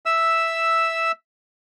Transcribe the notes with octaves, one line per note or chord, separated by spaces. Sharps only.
E5 E6